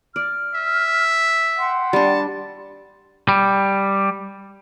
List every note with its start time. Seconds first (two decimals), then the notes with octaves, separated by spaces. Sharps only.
0.16 D5 F6
0.55 E5
1.57 F#5 G5 C6
1.93 G3 D4 A5
3.29 G3